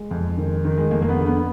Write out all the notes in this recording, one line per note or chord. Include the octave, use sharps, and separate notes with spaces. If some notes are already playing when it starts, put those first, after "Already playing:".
Already playing: G#3
F2
D#3
D#3
G#3
F2 A#3
A#3
B3
D3
B3